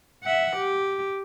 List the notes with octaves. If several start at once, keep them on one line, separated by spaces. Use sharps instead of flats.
E5 F#5
G4